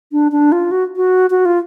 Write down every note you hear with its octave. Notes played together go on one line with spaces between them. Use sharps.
D4
D4
F4
F#4
F#4
F#4
F4